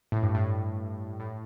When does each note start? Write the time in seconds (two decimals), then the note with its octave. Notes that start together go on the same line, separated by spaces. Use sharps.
0.12 A2
0.23 G2
0.35 A2
1.20 A2